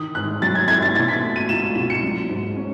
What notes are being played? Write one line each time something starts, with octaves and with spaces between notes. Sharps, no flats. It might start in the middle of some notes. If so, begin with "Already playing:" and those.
Already playing: D#3 D#6
G#2 F#6
F#3 A6
G#6
A3 G#6
A6
B2 A6
B6
A3
D#7
C#2 E7
B2 E7
C#7
F#3
G#2
C#4